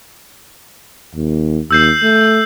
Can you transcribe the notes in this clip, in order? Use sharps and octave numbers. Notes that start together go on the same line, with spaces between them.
D#2
D#2 E6 G6 C7
A3